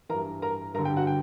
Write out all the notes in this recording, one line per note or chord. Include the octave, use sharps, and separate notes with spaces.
G2 E3 A#4 A#5
A#4 A#5
G2 D3 A#4 A#5
G4 G5
F#4 F#5
G5